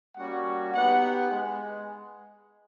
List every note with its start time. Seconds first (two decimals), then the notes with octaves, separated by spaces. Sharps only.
0.16 G3 A#3 C#4 F#4 F#5
0.74 B3 D#4 G4 F#5
1.31 G#3